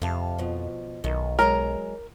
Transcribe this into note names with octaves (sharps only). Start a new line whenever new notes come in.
F2 C3 F5 A5
B2 F3
B1 D#3
F#3 G#3 A#4 A#5